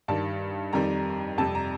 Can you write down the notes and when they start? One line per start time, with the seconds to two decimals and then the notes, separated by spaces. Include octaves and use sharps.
0.08 G2 D#3 G3 A5
0.73 F2 D#3 G3 A#5
1.38 F2 C3 G3 A5
1.55 A#5